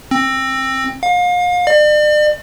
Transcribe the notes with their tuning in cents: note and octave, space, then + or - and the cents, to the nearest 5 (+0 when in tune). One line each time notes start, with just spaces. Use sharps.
C4 +20
F5 +35
D5 +40